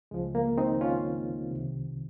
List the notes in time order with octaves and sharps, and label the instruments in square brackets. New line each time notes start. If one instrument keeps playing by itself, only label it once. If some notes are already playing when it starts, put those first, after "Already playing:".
[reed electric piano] C#2 C#3 F3 G#3
A#3
C4 D#4
C#4 F4
C2 C3 D#3